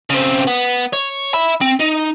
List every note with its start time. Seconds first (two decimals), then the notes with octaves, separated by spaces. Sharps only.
0.10 C#3 C4
0.47 B3
0.93 C#5
1.34 E5 B5
1.61 C4
1.80 D#4